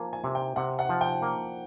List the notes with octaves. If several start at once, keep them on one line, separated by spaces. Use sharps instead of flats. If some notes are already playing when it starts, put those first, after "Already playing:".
Already playing: F3 A#3 G#5
G#5
C3
G5
C3 F#5
F#5
F3
G5
A#3